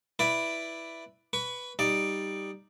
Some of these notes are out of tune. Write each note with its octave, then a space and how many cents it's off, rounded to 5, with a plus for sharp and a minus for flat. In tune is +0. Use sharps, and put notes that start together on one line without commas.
E4 +0 B4 +0 D5 +0
B4 +0 C#6 +25
G3 +0 D#4 +0 D5 +5